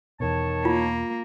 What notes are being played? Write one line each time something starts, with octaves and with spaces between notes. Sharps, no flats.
E2 B2 D#3 C#5 A5
A#3 F4